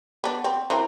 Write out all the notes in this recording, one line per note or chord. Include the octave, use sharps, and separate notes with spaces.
B3 D4
C4
E3 C4 A#4